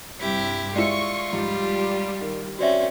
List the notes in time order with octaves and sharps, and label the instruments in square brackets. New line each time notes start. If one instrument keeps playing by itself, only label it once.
[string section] G2 C3 [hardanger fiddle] E4 G4
[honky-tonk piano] G#3 E4 [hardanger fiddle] F4 [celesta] D5 [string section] C#6
[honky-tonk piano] G#2 F3 [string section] G3
[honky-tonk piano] D#3
[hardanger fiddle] C4 C#4 [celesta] F#4 D5 E5